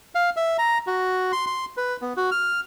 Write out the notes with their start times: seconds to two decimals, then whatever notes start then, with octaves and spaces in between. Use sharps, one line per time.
0.15 F5
0.37 E5
0.58 A#5
0.87 F#4
1.32 C6
1.47 C6
1.77 B4
2.02 B3
2.17 F#4
2.31 F6